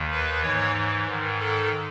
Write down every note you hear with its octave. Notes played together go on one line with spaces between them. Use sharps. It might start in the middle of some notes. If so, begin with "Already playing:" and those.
Already playing: D#2 D#3
B4
G#2 E3 C#5
G#2 D#3
A4